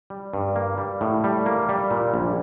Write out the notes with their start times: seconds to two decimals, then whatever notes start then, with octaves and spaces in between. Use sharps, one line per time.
0.10 G3
0.33 G2
0.56 A#3
0.78 G3
1.01 A2
1.24 G3
1.46 A#3
1.69 G3
1.91 A#2
2.14 A#1